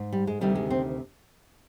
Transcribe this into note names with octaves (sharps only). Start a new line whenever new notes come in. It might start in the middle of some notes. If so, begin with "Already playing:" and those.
Already playing: G#2
G3
G#3
D2 C3 D#3 G3
G#3
C4